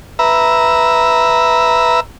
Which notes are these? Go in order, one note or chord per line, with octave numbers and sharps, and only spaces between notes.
B4 E5 A#5